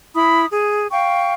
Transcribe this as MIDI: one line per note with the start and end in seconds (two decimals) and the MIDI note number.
0.14 0.45 64
0.14 0.45 83
0.14 0.45 87
0.51 0.86 68
0.92 1.33 77
0.92 1.33 79
0.92 1.33 85